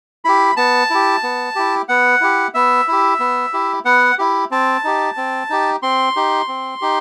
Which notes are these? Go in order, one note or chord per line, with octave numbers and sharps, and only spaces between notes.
E4 G4 B5
B3 A5
E4 G4
B3
E4 G4
B3 F#5
E4 G4
B3 E5
E4 G4
B3
E4 G4
B3 F#5
E4 G4
C4 A5
D#4 G4
C4
D#4 G4
C4 C6
D#4 G4
C4
D#4 G4